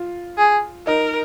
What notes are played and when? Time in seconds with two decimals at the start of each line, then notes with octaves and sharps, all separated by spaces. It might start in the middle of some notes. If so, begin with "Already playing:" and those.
Already playing: F4
0.38 G#4
0.87 D#4 A#4